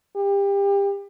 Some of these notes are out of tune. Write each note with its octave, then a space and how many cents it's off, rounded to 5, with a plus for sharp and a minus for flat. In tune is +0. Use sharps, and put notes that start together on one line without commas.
G4 +25